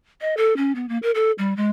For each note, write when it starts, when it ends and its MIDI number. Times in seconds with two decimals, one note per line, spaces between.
0.21 0.36 75
0.37 0.56 69
0.57 0.72 61
0.75 0.88 59
0.89 0.98 58
1.02 1.11 70
1.15 1.32 69
1.38 1.56 55
1.57 1.70 56